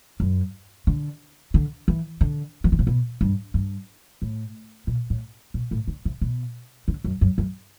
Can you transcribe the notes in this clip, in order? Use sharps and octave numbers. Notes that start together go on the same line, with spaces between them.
F#2
D3
D3
E3
D3
E3
D3
C3
B2
G2
G2
A2
B2
A2
B2
A2
D3
C3
B2
D3
F#2
F#2
F#2